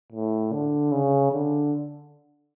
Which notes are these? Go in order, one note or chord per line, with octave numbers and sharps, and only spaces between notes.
A2
D3
C#3
D3